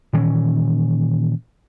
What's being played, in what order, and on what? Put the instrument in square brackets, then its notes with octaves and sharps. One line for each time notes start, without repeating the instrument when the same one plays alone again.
[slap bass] A#2 D#3 E3 C#4